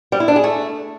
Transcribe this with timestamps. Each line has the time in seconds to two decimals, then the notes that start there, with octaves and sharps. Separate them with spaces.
0.12 G3
0.20 E4
0.28 D4
0.36 G#4
0.44 A3